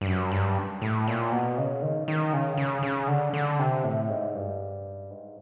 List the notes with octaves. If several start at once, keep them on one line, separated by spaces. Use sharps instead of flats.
G2
F#2
G2
A2
A#2
B2
C#3
D#3
D#3
C#3
C#3
C#3
D3
D3
C3
A2
G#2
G2
G#2